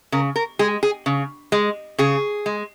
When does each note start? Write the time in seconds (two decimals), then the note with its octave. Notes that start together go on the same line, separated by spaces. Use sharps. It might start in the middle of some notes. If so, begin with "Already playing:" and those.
0.12 C#3 A#4
0.36 A#4
0.59 G#3 G#4
0.83 G#4
1.06 C#3
1.52 G#3
1.98 C#3 G#4
2.46 G#3